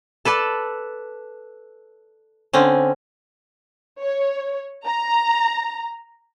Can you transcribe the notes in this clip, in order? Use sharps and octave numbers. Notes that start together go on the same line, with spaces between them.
A4 B4 D5 A5
D3 C4 C#4
C#5
A#5